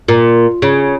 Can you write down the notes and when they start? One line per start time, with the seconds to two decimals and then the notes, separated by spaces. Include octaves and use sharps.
0.08 A#2
0.62 C#3